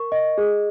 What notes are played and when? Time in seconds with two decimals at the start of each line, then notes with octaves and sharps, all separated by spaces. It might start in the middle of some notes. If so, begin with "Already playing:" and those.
Already playing: A#4 C#6
0.12 D#5
0.38 G#4